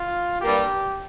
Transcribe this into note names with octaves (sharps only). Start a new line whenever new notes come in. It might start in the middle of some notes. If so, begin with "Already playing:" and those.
Already playing: F4
G2 G3 A#3 G4